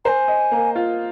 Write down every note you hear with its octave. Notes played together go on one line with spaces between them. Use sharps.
C5 G#5 A#5
D#5
A#3
F4